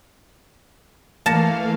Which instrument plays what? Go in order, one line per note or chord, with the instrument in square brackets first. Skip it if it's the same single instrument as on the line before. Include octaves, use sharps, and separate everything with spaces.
[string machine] E3 A3 F5 [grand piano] A#3 A#6 C#7 [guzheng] A5